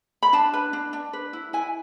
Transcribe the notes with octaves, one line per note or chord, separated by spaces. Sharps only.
B5
D4 A5
B4
D4
D4
B4
E4
E4 G#5